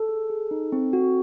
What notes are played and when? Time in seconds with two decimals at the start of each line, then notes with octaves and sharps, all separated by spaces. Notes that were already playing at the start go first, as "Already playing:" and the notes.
Already playing: A4
0.09 G#4
0.30 G#4
0.51 D#4
0.72 C4
0.93 F#4